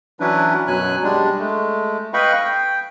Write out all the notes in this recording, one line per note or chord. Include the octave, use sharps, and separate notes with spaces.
E3 F#3 C#4 D4 E4 B4
F#2 B2 F#3 G#5 F#6
G3 G#3 D4
G#3 A3
B4 D#5 F5 G5 B5 C#6
G5